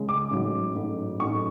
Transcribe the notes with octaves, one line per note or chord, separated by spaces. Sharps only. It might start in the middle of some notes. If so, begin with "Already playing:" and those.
Already playing: C#2 C#3 G#3
D6
A1 G#2 F#3
A1 G#2 F#3
A1 G#2 F#3 C#6